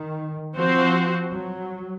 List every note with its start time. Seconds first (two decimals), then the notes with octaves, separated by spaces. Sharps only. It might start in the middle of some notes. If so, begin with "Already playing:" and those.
Already playing: D#3
0.56 F3 C4 F#4 C5
1.32 F#3